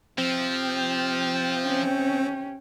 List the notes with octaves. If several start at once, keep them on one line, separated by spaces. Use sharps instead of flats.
C3 F3 C4 G5
C#4